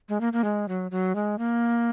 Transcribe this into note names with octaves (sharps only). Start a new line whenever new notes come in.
G#3
A#3
A#3
G#3
F#3
F#3
G#3
A#3